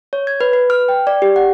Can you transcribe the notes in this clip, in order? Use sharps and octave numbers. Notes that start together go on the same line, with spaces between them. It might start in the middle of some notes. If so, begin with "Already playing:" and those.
C#5
G#6
B4
B4
F6
G5
D5
G4
F#5